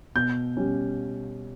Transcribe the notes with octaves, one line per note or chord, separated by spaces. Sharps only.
B2 G6
G3 C#4